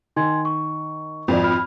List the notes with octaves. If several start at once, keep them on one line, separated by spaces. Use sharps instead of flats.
D#3 G#5 C6 G#6
C#6
G#1 F2 F3 D5
B5 F6